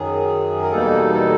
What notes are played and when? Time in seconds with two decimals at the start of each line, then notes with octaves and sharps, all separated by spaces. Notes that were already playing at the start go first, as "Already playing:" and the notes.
Already playing: F#2 D#3 F#3 G#4
0.60 A#4
0.71 E2 B2 G3 A#3 D#4 A4
1.13 A4